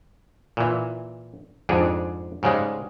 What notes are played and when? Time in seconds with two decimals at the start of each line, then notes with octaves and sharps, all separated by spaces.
0.57 A#2 E3
1.69 F2 G#2 D4 G#4
2.43 G#2 C#3 G3 G#3